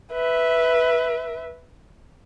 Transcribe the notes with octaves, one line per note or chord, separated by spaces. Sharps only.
B4 E5